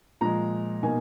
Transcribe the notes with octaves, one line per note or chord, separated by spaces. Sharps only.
A#2 F3 G#3 A#5
B2 A#3 D#4 G#5